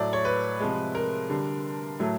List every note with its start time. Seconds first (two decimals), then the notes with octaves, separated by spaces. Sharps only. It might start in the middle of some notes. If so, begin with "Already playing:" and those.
Already playing: A2 F#3 A3 D5
0.13 C#5
0.25 B4
0.60 C3 F3 G#3
0.95 A#4
1.30 D3 G3
2.00 A2 F#3 A3